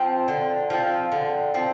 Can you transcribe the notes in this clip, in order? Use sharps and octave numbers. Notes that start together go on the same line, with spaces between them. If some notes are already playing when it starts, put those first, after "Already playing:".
Already playing: F3 C4
D3
F3 C4
D3
F3 C4